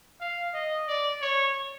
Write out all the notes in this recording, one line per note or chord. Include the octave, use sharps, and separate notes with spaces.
F5
D#5
D5
C#5